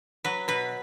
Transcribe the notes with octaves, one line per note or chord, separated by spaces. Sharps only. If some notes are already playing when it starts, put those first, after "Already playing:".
F#3 B4
B2 B4